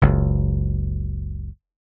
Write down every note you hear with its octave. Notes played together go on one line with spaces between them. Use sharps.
F#1 C#2